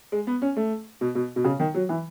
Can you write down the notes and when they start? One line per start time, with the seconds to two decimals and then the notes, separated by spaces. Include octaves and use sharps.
0.12 G#3
0.27 B3
0.42 C#4
0.56 A3
1.01 B2
1.15 B2
1.36 B2
1.44 C#3
1.60 D#3
1.74 F#3
1.89 E3